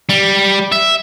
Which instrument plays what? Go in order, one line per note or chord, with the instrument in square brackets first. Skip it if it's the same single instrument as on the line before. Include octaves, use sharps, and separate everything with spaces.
[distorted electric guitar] G3
E5